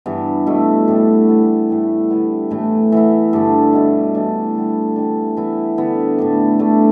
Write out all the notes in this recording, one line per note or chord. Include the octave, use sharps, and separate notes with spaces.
G2 E3 B3
B2 A3 E4
A2 G3 D4
E3 B3 E4
A2 G3 E4
D3 B3 E4
A2 E3 A3 E4
E3 B3 E4
G2 D3 A3 D4
B2 B3 E4
E3 A3 D4
D3 G3 B3
E3 G3 B3 D4
E3 B3 E4
D3 B3 E4
A2 G3 D4
D3 A3 D4